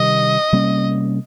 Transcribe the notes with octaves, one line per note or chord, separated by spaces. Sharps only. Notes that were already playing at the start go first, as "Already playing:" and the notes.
Already playing: C3 D#3 G3 D#5
C3 G3 A#3 C#4